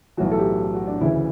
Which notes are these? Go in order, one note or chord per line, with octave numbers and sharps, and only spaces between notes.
B1 A2 E3 F#4
A4
G4
F#4
D4
D2 C#3 E3 E4